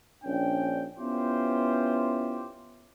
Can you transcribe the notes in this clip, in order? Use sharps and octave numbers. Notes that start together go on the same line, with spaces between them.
A#1 C#4 D4 G5
B3 C#4 E4 F4 G4 C5